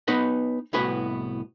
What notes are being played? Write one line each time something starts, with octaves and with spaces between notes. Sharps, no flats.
B3 D#4 B4 C#5 D#5
C2 A2 B3 F#4 B4 G#5